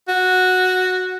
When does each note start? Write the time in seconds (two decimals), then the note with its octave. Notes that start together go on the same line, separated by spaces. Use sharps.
0.08 F#4